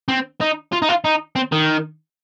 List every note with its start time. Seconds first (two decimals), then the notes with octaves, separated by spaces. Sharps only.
0.08 C4
0.41 D#4
0.72 F4
0.82 D#4
0.89 F4
1.04 D#4
1.36 C4
1.52 D#3